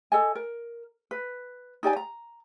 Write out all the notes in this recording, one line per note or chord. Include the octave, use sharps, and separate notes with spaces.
A4 D#5 G#5
A#4
B4
D#4 G4 D5 G#5
A#5